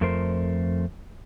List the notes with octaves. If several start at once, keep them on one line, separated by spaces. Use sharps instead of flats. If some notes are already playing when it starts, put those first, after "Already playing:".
F2 A3 A#4 C5